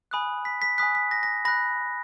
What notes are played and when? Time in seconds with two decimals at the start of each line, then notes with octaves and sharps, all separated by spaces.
0.11 G#5 B5 D#6 F#6
0.45 B6
0.62 B6
0.78 G#5 B5 D#6 F#6 B6
0.95 B6
1.11 A#6
1.23 A#6
1.45 B5 F#6 A#6